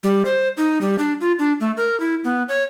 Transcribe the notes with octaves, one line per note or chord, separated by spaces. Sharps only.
G3
C5
D#4
G3
D4
F4
D4
A3
A#4
E4
B3
C#5